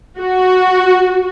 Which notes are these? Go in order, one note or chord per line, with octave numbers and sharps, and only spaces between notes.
F#4